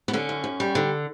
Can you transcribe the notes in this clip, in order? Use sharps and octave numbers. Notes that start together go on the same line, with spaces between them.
B3
D3 C#4
F#2
F#2
G3
D3